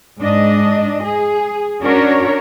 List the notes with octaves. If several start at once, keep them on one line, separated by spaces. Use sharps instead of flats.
G#2 D4 D#5
G#4
C#4 D4 F#4 A#4 C#5